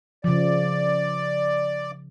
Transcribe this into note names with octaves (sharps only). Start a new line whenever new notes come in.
C#3 F3 D5